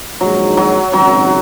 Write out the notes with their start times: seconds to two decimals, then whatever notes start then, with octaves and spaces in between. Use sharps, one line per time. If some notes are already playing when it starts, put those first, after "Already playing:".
0.21 A#1 G#2 D#3 F#3 G#3
0.57 F#3
0.93 G#1 F#2 C#3 F#3